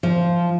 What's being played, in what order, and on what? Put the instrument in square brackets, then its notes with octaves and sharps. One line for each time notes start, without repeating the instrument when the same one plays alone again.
[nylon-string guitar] F3